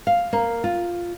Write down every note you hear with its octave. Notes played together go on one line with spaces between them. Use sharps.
F5
A#3
F4